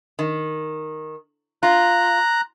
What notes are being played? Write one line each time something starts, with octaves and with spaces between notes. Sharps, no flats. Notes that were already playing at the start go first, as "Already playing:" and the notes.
D#3
F4 A#5 F#6